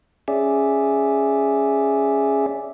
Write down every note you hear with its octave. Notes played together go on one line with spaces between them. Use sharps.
C#4 G#4 D5 E5